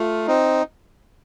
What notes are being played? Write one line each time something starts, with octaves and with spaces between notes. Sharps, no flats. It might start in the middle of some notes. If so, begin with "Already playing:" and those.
Already playing: A3 F4
C4 D#4